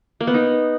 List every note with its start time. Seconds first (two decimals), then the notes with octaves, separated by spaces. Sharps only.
0.21 A#3
0.27 B3
0.34 D#4